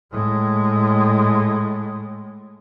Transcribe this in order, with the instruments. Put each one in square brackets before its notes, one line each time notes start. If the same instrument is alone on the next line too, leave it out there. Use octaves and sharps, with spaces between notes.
[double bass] A2 G#3